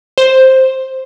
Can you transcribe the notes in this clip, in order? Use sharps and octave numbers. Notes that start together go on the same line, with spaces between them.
C5